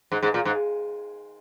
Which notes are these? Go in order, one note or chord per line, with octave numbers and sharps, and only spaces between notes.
G#2
G#2
A#2
G#2